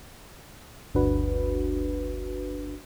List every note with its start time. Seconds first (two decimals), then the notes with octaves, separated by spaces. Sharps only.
0.94 G1 D2 D4 F#4 B4